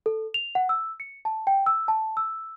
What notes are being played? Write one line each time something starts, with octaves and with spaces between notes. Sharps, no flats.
A4
F7
F#5
E6
C#7
A5
G5
E6
A5
E6